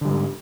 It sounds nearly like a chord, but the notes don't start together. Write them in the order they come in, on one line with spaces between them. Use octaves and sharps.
D3 G3 G#2